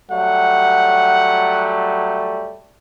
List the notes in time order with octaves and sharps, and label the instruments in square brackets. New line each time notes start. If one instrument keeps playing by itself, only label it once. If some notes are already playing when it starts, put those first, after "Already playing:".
[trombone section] F#3 G3 A3 [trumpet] F#5